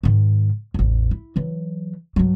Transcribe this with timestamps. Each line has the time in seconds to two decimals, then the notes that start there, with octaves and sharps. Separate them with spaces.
0.03 G#2 D#3
0.74 A1 E2
1.11 E4
1.36 E3 F#3
2.16 G2 F#3